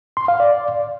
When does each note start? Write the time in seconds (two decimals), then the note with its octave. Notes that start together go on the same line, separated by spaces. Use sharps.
0.17 C6
0.28 F5
0.40 D5